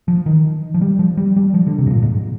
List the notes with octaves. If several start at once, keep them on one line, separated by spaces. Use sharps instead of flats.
F3
D#3
F3
G3
F3
G3
G3
F3
D3
C3
G#2
A#2
G#2